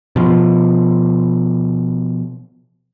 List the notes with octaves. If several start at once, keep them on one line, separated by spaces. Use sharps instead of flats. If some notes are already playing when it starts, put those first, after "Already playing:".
B2 F3